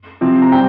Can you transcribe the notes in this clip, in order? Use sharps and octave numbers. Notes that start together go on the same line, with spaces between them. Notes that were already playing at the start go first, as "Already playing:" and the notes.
C3 F3 C4
A#5
G3 C4 G5